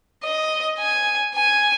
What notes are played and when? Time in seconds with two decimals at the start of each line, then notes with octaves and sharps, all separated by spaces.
0.24 D#5
0.79 G#5
1.35 G#5